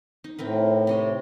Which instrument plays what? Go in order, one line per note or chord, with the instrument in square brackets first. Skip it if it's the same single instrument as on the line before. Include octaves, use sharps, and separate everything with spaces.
[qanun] D#4
[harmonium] A2 [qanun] C4 A#4 B4
[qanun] C3 C#5 D#5